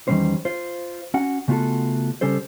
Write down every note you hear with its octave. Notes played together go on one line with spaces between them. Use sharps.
E2 D#3 F#3 G3 C#4 C5
F4 C5
C#4 F#4 F#5
C#3 A3 B3 F4 F#4 A4
C#3 G3 C#4 A4 C5